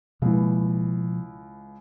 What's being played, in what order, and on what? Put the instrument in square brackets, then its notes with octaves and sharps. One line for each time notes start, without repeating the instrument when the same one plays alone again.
[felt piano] C#2 E3 [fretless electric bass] B2 F3 A#3